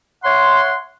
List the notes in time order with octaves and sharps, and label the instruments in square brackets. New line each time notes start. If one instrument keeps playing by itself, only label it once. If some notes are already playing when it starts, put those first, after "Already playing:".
[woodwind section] C#5 E5 F#5 C6